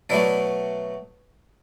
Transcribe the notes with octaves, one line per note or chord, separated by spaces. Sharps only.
B2 F#3 A3 D4 E4